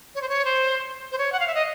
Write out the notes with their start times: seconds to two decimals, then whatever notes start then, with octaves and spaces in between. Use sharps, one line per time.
0.15 C#5
0.22 C5
0.29 C#5
0.45 C5
1.12 C5
1.18 C#5
1.32 F#5
1.40 F5
1.47 E5
1.55 D#5